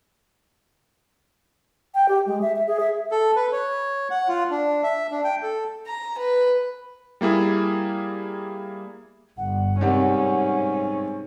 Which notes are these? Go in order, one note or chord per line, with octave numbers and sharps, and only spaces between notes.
G5
G4
G#3
E5
E5
G#4
E5
A4
B4
C#5
F#5
F4
D4
E5
D4
G5
A4
A#5
B4
G3 A#3 E4 G#4
G1 F#5
G#2 C3 G3 A#3 C#4